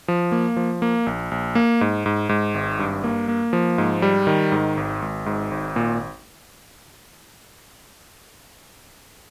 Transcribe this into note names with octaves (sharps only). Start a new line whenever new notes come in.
F3
A#3
F3
A#3
A#1
A#1
A#3
G#2
G#2
G#2
G#1
G2
A#3
A#3
F3
G#2
G3
D#3
G#2
G#1
G#1
G#2
G#1
A#2